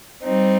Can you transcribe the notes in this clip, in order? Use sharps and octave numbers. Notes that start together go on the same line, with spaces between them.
G3 C4 D#4